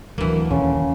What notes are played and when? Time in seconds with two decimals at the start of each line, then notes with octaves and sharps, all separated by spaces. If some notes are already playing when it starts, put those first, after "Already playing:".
0.18 D2 E3 F#3 A#3
0.51 D#1 C#3